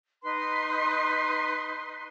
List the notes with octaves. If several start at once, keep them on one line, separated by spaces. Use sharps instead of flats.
D#4 B4 C6